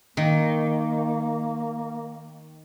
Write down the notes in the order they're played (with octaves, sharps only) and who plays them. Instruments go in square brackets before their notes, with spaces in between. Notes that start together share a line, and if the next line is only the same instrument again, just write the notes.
[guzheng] D#3 [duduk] A#3